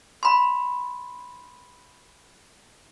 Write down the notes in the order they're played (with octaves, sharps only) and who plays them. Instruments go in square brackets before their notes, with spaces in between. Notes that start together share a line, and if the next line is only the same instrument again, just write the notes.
[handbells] B5 C6